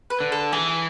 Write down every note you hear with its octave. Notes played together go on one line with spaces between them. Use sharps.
B4
D3
A4
E3 G#4